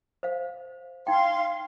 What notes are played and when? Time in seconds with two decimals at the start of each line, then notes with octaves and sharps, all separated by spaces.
0.23 C5 F5
1.07 D#4 F5 G5 C6